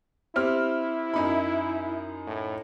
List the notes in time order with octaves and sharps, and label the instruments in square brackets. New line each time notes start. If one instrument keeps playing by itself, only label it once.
[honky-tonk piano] C4 G4 F6 [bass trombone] E4
[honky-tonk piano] F#2 D#4 B5
[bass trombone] A2